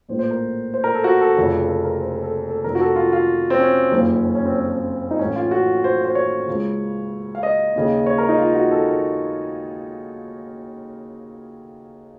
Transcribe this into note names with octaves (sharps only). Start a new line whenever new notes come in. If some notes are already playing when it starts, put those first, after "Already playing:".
A#1 A2 C5
C5
A#4
C5
A#4
A4
F#4
A4
F1 F2 C#3
A4
A#4
C5
A#4
A4
A4
F1 F2 D#3 A#4
F#4
A4
F4
F4
C4
C#4
F#1 F2 D#3
C#4
C#4
C4
C#4
C4
C#4
D#4
A1 A2 C#4
F4
F#4
C5
C5
C#5
C#2 C#3
F5
D#5
D#2 C#3
C#5
A#4
D#4
F4
F#4
A4
A#4